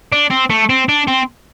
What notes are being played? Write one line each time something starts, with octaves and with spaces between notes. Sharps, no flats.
D4
C4
A3
C4
D4
C4